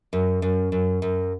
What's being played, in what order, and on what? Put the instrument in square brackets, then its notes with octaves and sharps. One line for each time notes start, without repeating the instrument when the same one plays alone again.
[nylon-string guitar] F#2
F#2
F#2
F#2